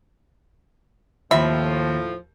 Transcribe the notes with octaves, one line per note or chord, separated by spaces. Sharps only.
D#2 A2 F3 C4 E5 B5